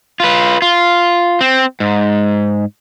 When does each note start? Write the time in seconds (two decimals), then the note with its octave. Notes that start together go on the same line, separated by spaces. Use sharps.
0.20 F4 B4
0.62 F4
1.41 C4
1.80 G#2